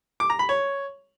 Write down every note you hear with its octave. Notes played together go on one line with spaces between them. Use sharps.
D6
A#5
B5
C#5